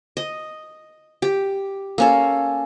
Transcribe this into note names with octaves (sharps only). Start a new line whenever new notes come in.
D#5
G4
A#3 C#4 A4